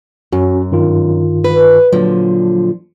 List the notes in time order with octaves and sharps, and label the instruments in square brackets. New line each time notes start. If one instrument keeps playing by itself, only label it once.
[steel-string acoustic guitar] F#2 [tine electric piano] C#4 F#4
[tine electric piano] G2 D#3 F4
[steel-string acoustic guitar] B4
[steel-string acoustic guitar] A#2 D3 F3 [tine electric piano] F#3